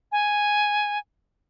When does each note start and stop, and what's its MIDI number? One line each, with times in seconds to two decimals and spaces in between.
0.12 0.98 80